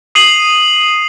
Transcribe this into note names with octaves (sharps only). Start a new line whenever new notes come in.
D#6 C7 D#7 F#7